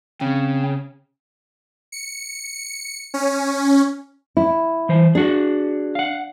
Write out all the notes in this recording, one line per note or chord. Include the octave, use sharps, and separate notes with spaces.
C#3 C4
C#7
C#4
E4
E3 C5
D4 F#4 G#4
F5 F#5